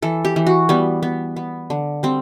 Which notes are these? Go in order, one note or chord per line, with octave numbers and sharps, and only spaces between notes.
E3 A4
G4
E3
F#4
G3 B3
B3
B3
D3
G3 C4